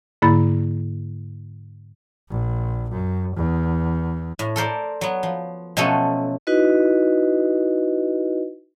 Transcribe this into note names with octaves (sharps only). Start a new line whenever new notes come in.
G#2 D3 A#3 E4 B5 A6
A#1
F#2
E2
A2
A4 A#4 C5 D5
F#3 B3
F3
B2 F3 F#3 A3 C#4 A4
D#4 E4 F#4 B4 D#5